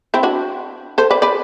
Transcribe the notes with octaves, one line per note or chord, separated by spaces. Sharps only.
C4 E4
D4 F#4
A4 C5
B4 D5
B4 D5